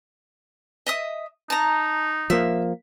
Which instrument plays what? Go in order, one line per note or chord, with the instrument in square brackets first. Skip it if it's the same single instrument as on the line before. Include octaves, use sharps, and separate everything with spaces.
[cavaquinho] D#5 E5 D#6
[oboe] D#4 [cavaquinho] A5 A#5
[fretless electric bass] F3 A#3 [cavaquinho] E5